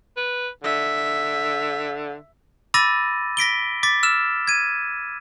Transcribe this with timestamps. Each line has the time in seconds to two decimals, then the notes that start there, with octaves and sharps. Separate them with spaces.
0.17 B4
0.64 D3 E5
2.74 B5 D6 E6 A6 A#6 D#7
3.37 A#6 B6 D7 G7
3.83 D6 A6 B6
4.03 E6 F6 E7
4.47 G#6 D#7